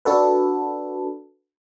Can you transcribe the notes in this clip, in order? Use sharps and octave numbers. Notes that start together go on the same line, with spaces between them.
D4 F#4 A4 B4